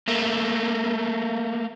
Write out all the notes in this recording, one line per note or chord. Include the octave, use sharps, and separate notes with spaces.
A3 A#3